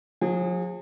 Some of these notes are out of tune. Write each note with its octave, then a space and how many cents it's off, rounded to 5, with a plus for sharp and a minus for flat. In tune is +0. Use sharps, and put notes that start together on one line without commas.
F3 +45 G#4 -20